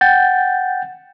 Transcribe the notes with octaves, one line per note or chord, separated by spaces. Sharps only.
F#5 G5 G6 A6